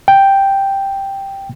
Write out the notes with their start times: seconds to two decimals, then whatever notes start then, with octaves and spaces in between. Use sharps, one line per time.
0.08 G5